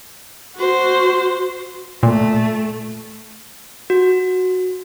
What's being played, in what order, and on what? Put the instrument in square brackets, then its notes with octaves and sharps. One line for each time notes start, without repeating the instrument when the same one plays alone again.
[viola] F#4 C5
[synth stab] A#2 [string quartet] A3
[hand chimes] F#4